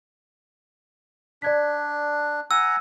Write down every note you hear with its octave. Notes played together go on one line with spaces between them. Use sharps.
D4 D5 G#6 B6
F#5 G#5 A#5 E6